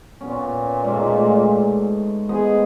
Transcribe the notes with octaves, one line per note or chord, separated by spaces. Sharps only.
A#2 B3 C#4
G#2 A3
B3 G#4 C5 D#5